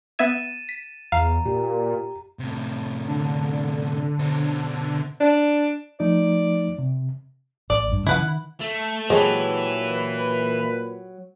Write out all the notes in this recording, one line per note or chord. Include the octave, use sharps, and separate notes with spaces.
B3 E5 G#6 A6 D#7 E7
B6
E2 F5 A#5
A#2 G4
A2 C3
D3
B2 C5
D4
F3 A3 D#4 D5
C3
A1 D5
G2
C#3 F3 E4 B4 F#5
D#3
A3
A#2 E3 F#3 G#3 G4 A4 B4 C5